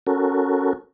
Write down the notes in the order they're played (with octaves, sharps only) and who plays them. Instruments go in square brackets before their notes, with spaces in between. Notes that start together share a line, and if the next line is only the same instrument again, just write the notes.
[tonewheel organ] C#4 F#4 A4 A#4